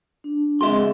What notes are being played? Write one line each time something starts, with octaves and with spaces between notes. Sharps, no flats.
D4
C#2 G#3 C4 F#4 G#4 D#5 E5 C6